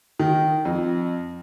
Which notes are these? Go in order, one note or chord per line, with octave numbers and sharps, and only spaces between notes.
D#3
F2